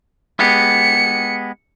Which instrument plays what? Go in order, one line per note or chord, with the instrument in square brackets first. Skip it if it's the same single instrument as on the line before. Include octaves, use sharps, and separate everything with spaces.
[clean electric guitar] G#3 B3 G4 [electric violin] C#7